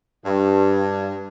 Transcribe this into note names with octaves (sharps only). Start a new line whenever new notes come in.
G2